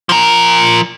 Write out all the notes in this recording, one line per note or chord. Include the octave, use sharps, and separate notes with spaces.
F3 A#4